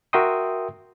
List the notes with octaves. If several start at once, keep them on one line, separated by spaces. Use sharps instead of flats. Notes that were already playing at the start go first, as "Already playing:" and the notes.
F#4 A#4 E5 G5 C6 D#6